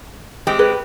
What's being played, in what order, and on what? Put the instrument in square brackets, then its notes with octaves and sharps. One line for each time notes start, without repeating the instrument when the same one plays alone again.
[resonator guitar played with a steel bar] G#3 C4 G4
[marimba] G#4 [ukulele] B4